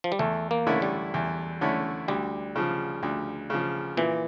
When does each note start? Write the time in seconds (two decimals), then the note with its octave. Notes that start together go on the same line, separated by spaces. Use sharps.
0.04 F3
0.12 G3
0.19 E2 A3
0.51 A#3
0.67 D3 A3 C#4 E4
0.82 G3
1.14 E2
1.61 D3 A3 C#4 E4
2.08 D2 G3
2.56 C#3 F3
3.03 D2
3.50 C#3 F3
3.97 A#2 E3